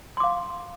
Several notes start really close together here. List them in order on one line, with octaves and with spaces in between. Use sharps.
C6 D6 F5